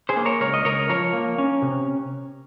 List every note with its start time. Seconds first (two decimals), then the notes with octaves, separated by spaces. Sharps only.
0.09 G#4 C5
0.17 A#3
0.25 A#4 C#5
0.41 C#2 A#4 C#5
0.54 D#5
0.65 C#2 A#4 C#5
0.89 F3 A#4 C#5
1.13 A#3
1.38 C#4
1.62 C3